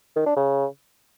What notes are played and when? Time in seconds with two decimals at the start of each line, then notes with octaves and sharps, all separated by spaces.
0.16 D#3
0.26 D4
0.36 C#3